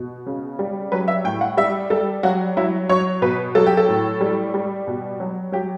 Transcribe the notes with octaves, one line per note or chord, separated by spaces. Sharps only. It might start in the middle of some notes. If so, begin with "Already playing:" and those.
Already playing: B2
C#3
G3
F#3 B4
E5
A2 G5
F#5
G3 E5
G3 A4
F#3 F#4
F#3 E4
F#3 C#5
B2 B4
F#3 A4
G4
A4
A2
G3
G3
B2
F#3
F#3 G4